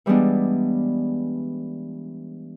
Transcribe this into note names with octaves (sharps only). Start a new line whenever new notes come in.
E3 G3 G#3 B3 D4